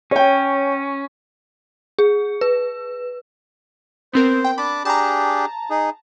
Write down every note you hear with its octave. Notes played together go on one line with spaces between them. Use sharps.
C#4 C#5 G5
G#4
B4
B3 C4 A#4 C5
G5
D4 A5 B5 D6
D4 G4 G#4 A5 A#5
D#4 G#4